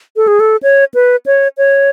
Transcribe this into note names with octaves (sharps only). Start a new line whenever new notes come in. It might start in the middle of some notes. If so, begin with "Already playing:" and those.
A4
G#4
A4
C#5
B4
C#5
C#5